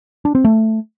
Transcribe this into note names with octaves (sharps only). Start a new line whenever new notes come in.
D4
C4
A3